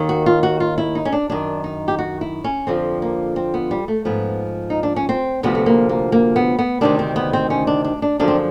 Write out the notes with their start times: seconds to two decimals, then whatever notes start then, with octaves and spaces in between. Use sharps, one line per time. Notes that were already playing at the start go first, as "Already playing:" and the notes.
Already playing: D#2 D#3
0.09 F#4
0.26 F4
0.43 F#4
0.60 F4
0.78 E4
0.95 D#4
1.05 C#4
1.12 D4
1.30 F#2 D#3 D4
1.64 D#4
1.88 G4
1.99 F#4
2.21 E4
2.44 C#4
2.67 F2 D3 F3 C4
3.02 A#3
3.36 C4
3.54 B3
3.71 G3
3.88 A3
4.05 G#2 F3 B3
4.70 D#4
4.83 D4
4.96 C#4
5.09 C4
5.43 D2 C3 F3 B3
5.55 A3
5.66 A#3
5.89 A#3
6.12 A#3
6.36 B3
6.59 B3
6.81 D2 C3 D#3 D4
6.99 C4
7.16 B3
7.33 C4
7.50 C#4
7.67 D4
7.84 D4
8.02 D4
8.20 F#2 D3 F3 D4
8.28 C4